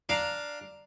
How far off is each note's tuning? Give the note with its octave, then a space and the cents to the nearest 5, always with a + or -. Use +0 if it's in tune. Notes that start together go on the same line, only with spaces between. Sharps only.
D4 +0 F5 +0 A#5 +0